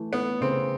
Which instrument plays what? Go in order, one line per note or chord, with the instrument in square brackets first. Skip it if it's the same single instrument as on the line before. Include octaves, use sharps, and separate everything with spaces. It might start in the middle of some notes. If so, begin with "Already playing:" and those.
Already playing: [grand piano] E3 A3
[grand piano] A3 [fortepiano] B3
[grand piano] C#3 [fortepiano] C4